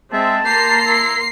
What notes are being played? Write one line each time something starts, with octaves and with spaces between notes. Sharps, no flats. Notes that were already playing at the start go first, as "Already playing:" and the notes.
G#3 C4 E5 A5
A#3 G4 A#5 C6 C7
E4